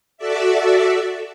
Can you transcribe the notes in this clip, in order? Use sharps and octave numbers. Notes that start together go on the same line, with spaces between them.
F#4 A4 D5 E5